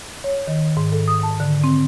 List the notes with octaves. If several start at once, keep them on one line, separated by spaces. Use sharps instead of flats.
C#5
D#3
G#2
A4
D#6
A5
D3
C4